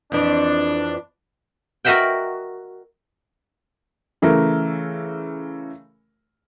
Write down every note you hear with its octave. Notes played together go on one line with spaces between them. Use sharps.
F2 E3 D4
F#4 A#4 D#5 E5 F#5 G5
C#3 E3 A3 A#4